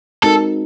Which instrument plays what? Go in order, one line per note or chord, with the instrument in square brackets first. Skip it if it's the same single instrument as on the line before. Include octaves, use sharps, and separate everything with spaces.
[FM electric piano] G#3 C4 D#4 F#4 A#4 [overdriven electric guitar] A4